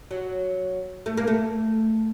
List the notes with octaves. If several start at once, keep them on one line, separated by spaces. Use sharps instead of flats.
F#3
A3
A#3
A3